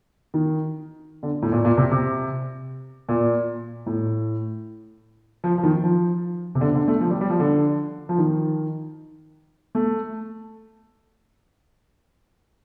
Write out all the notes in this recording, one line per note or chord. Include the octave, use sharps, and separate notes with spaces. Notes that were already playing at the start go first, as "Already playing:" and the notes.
D#3
D3
A2
A#2
A#2
C3
C3
A#2
A2
F3
F3
D#3
F3
C3
D3
D3
A3
F3
G3
G3
F3
D3
F3
D#3
A3